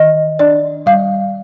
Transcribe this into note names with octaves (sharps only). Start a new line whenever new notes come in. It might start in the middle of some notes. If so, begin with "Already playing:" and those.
Already playing: D#3 D#5
D4 D5
G3 F5